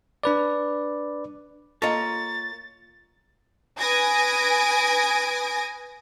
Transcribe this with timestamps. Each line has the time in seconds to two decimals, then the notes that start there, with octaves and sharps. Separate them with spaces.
0.24 D4 B4 D5
1.82 A#3 F4 A4 C#5 D#5 A#5 A6 A#6
3.79 B4 G#5 D#6 G#6 A#6 D7